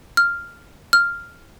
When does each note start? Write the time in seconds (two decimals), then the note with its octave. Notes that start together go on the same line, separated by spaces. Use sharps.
0.17 F6
0.93 F6